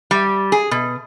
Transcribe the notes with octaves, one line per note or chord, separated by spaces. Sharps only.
G3
G#4
B2